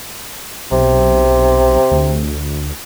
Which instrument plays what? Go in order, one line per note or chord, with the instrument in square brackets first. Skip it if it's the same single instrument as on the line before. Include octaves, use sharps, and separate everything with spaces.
[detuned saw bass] B1 [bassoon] C3
[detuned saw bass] D2